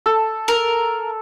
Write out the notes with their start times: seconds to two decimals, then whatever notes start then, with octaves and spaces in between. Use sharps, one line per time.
0.06 A4
0.48 A#4